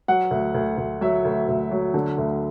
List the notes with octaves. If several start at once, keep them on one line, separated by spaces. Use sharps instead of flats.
F#3 F#5
D2
D2
D2
F#3 E5
D2
D2
F#3
D3
D2